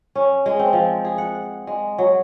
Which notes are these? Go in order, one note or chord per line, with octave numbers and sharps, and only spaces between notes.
C#4
G#3
C4
F3
G#4
F#5
G#3
F#3